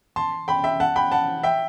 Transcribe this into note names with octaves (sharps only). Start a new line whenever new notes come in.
A5 C6
G5 B5
E5 G5
F#5 A5
G5 B5
F#5 A5
E5 G5